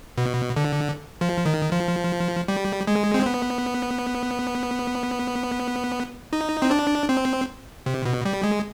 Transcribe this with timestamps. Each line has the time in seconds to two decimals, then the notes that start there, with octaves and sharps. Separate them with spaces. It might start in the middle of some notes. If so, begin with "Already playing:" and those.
0.18 B2
0.56 D3
1.21 F3
1.46 D#3
1.72 F3
2.48 G3
2.87 G#3
3.14 C4
3.26 B3
6.33 D#4
6.62 C4
6.71 D4
7.09 C4
7.86 C3
8.05 B2
8.25 G3
8.43 G#3